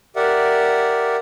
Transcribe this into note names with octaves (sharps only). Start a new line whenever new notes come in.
G4 A#4 D5 E5 F#5